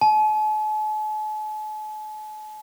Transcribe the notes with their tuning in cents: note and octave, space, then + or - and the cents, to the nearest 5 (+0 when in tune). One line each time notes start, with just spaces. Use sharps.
A5 -45